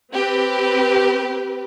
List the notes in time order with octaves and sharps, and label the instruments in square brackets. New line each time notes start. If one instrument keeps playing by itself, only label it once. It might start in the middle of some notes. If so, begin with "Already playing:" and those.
[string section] C4 G4 B4